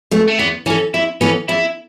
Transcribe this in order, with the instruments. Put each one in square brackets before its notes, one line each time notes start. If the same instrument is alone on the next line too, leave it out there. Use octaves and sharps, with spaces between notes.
[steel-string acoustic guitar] B2 A3 E4
[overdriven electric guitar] A3
[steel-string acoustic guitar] E2 [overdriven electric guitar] B3
[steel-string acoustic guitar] E3 B3 A4 [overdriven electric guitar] C#4
[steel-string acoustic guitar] E2 [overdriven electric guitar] E4
[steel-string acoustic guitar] E3 B3 A4 [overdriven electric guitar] C#4
[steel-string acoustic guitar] E2 [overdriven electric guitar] E4